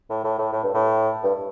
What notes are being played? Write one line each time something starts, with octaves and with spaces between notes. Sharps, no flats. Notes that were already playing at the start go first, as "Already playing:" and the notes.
A2
A2
A2
A2
G2
A2
G2